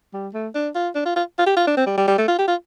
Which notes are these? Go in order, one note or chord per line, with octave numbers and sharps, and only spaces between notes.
G3
A3
D4
F4
D4
F4
F4
F4
G4
F4
D4
C4
G3
G3
G3
A3
F4
G4
F4